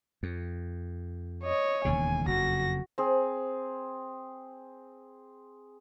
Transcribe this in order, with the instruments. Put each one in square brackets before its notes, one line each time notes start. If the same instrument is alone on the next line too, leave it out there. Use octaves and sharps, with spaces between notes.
[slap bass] F2
[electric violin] C#5 D#5
[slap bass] E1 D#2 C#3 [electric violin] G#5
[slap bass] F#1 F2 [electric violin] F#4 A#6
[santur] C4 G#4